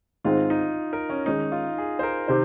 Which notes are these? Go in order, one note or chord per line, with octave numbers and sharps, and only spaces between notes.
G#2 D#3 G#3 C4 F4
D#4
A#4
C#4
D#3 G#3 C#4 D#4
F4
G#4
C5
A#4
C3 D#3 C5